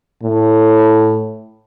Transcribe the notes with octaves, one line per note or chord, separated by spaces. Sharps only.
A2